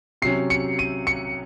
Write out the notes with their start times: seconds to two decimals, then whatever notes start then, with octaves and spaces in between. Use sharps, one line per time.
0.22 C3 F#3 C#4 C7
0.50 C#7
0.79 D#7
1.07 C#7